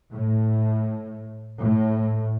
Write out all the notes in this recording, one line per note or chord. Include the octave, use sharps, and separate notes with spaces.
A2
A2